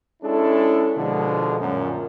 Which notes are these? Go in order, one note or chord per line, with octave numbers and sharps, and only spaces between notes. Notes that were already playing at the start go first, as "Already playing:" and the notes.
G#3 C#4 D4 E4 A4
B2 D3 F3 G#3
F#2 A#2